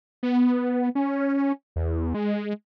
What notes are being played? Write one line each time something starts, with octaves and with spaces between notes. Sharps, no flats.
B3
C#4
E2
G#3